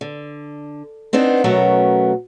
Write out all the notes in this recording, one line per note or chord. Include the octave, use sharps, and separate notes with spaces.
D3
B3 C4 D4 D#4 C5
B2 F#3 A3 B3 C#4 A#4